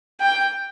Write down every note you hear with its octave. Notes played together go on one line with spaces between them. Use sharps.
G5